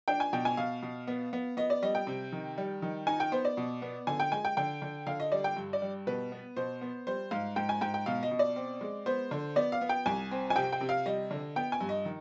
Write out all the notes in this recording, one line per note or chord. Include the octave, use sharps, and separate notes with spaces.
D4 G5
G#5
B2 G5
G#5
B2 F5
B2
B3
B3
B3 D#5
D5
G3 D#5
G5
C3
D#3
G3
D#3
D#4 G#5
G5
B3 C5
D5
B2
B3
D3 G#5
G5
G#3 G#5
G5
D3 G5
D3
D3 F5
D#5
G3 D5
G5
G2
D5
G3
B2 B4
B3
B2 C5
B3
G3 C5
G#2 F5
G#2 G5
G#5
G#2 G5
G5
B2 F5
D#5
B2
D5
C4
G#3
B3 C5
D3
B3 D5
F5
B3
G5
C2 G#5
C4
G#5
C3 G5
G5
C3
F5
G3 D#5
D3
B3 G5
G#5
G2
D#5
D#3